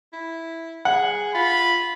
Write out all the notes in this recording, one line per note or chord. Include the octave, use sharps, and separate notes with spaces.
E4
G#4 F#5
F4 B5